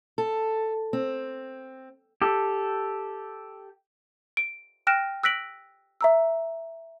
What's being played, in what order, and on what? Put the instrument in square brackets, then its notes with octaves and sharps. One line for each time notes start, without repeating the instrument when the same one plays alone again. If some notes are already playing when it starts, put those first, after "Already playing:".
[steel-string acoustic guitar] A4
C4
[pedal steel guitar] G4 A4
[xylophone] D7
G5 F6 F#6 A#6 D7 E7
E6 F#6 A#6 B6 D7 F#7
E5 A#5 E6